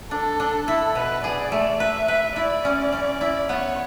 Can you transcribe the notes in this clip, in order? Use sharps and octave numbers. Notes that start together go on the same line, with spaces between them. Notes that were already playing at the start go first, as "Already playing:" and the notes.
D4 A4
D4
E4 A4
B2 B4
G#4 D5
A3
B4 E5
B4
E4 D5
C#4
C#4
E4
B3 C#5